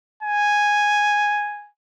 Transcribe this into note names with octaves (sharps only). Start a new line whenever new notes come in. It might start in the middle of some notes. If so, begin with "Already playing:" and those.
G#5